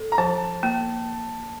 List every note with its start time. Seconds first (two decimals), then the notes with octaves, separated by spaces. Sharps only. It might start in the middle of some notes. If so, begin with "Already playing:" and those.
Already playing: A4
0.12 A#5
0.18 F3 A5
0.63 A#3